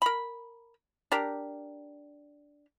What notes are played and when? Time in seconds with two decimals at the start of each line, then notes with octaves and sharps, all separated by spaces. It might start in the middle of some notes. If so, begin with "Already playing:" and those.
0.02 A#4 B5
1.12 D4 G4 A#4